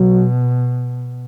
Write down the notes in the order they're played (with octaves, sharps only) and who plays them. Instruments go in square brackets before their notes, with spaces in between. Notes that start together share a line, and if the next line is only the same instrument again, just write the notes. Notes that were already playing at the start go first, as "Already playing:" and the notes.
Already playing: [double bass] B2 [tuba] F#3